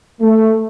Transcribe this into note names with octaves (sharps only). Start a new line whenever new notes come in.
A3